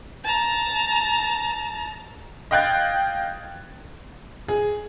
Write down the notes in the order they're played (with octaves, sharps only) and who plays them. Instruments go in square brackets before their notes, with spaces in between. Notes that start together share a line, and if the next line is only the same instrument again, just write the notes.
[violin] A5 A#5
[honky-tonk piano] D#5 F5 G5 F#6 G#6 A6
[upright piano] G#4